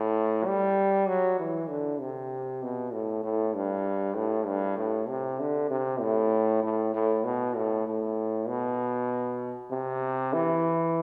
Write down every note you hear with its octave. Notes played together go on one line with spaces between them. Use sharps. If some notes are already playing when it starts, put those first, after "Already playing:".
Already playing: A2
G3
F#3
E3
D3
C3
B2
A2
A2
G2
A2
G2
A2
C3
D3
C3
A2
A2
A2
B2
A2
A2
B2
C3
E3